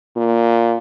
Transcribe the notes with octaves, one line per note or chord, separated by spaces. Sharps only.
A#2